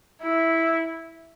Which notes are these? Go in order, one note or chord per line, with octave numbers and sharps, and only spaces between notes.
E4